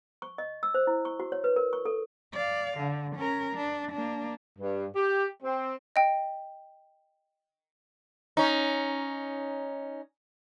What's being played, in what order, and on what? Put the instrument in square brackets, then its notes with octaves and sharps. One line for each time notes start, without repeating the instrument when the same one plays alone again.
[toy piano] C#6
D#5
E6
C5
E4
C#6
F#4
C#5
B4
A#4
C#6
A4
[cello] D5 F5
D3
C#4 A#4
D4
A#3 D4
[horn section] G2
G4
C4
[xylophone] D#5 G5
[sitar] C#4 D#4